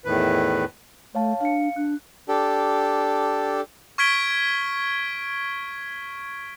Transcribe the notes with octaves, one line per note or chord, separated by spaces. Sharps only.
E2 A2 D#3 B4
A3 C#5 F5 A5
D4 F5 C#7
D4 F#6
D4 G4 A4
C#6 F6 G#6 B6 D7 G7